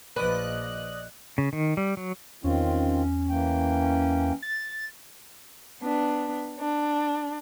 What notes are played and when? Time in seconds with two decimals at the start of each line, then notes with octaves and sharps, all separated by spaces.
0.16 A#1 F3 B4 D5 D#5 F#6
1.38 C#3
1.53 D#3
1.77 G3
1.97 F#3
2.44 E2 D#3 C4 C#4 F4
3.30 E3 A#3 G5
4.42 A6
5.81 B3 D4
6.60 D4